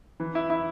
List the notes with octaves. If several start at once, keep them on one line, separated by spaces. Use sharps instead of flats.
E3
E4
E4